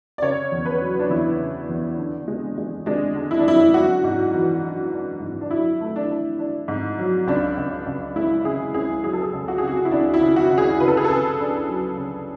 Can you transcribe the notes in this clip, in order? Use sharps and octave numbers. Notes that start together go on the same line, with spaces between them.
D5
C#3 C#5
E2
B4
F#3
D4
E2 E4
C#3
E2
D3
G#3
G#3
G#3 D4
D3
E4
D4
F#2 E4
D4 F#4
G#2
E3
D4
D4
G#2
D4
F#3 E4
A3
D4
D4
D4
G#2
F#3
C#2 D4
C#2
C#2
G#3 E4
C#3 G#4
C#2 G#4
F#3 G#4
A4
G#4
C#2
F#4
C#3 G#4
F#4
E4
C#2 D4
E4
C#3
F#4
C#2
G#4
C#3 B4
A4
G#4
A4
C#3
D4
F#3
C#3